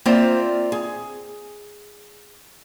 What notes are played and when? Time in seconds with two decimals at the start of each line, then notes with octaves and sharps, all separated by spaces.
0.05 A#3 C4 F4 C5 D5 E5
0.72 G#4